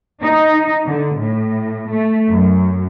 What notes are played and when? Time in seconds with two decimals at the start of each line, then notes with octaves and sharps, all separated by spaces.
0.22 D#4
0.88 D3
1.18 A2
1.91 A3
2.30 F#2